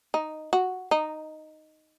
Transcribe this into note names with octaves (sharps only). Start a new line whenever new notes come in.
D#4
F#4
D#4